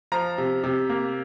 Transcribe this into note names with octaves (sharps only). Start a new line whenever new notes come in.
F3 A#5
C3
C3
A#3